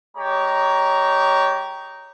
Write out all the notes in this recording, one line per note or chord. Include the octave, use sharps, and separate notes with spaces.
G#3 G4 C#5 A#5